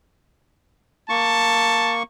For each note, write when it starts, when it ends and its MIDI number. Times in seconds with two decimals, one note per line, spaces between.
1.10 2.03 58
1.10 1.95 81
1.10 2.03 85